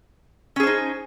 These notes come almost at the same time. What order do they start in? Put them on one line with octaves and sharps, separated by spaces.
C#4 G#4 C5 D#4